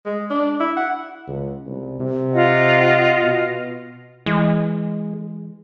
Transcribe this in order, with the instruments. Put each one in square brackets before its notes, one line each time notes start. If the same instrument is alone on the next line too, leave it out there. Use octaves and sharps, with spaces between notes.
[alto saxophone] G#3
D4
E4
F#5
[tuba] C#2
C2
C3
[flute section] F4 D#5 F#5
[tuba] B2
[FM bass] E3 [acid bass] G#3